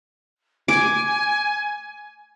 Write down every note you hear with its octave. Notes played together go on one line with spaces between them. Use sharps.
G#5 D6